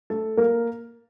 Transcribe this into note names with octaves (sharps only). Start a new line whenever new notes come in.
A3 A4
A#3 A#4